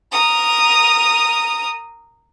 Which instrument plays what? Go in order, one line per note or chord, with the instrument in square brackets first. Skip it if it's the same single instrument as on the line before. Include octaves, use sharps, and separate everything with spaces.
[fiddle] A#4 D#6